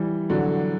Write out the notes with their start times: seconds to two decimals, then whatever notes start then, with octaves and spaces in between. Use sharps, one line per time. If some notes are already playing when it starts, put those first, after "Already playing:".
Already playing: E3 G3
0.30 D3 F#3